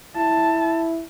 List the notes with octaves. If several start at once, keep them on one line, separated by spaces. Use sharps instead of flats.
E4 A5